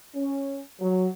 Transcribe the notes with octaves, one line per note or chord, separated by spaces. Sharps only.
C#4
F#3